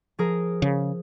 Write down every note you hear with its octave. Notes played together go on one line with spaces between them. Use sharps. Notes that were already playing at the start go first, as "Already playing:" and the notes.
F3 G#4 A#4
C#3